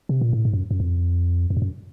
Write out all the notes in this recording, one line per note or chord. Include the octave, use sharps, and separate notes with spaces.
C3
A#2
A2
G#2
F#2
F#2
F2
F2
G2
F#2